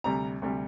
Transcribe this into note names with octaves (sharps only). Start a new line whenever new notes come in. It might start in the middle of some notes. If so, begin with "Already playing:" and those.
D2 C3 G3 A#5
D2 C3 G3